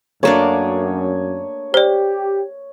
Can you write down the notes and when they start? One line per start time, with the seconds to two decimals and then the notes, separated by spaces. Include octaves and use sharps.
0.23 F#2 A3 A#3 D4 C#5 D#6
1.74 G4 C5 D5